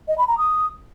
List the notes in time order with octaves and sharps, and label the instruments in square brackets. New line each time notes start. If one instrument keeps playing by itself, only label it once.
[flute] D#5
B5
A#5
D#6